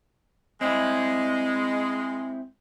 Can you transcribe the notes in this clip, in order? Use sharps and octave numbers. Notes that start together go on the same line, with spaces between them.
G#3 C4 E4 D#5